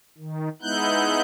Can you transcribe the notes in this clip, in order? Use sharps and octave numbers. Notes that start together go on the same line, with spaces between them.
D#3
G#3 B3 D#4 E4 F#6 G6